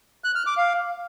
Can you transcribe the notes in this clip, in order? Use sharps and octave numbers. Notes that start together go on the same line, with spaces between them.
F#6
F6
D6
F5